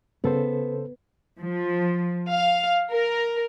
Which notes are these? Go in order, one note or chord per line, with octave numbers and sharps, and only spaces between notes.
C#3 B3 A4 C5
F3
F5
A#4